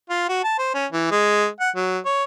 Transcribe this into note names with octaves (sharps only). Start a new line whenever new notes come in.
F4
F#4
A5
C5
C#4
E3
G#3
F#5
F#3
C#5